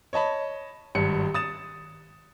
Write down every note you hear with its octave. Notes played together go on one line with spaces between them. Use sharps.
C#5 D#5 A5 B5
G#1 G2 C#7
D#6 A6 E7